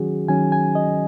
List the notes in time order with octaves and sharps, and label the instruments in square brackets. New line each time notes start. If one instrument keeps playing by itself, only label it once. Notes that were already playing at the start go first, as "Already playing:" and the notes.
Already playing: [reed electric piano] D#3 F#3 C#4 F#4 G#4
D#3 F#3 C#4 G#5
G#5
D#5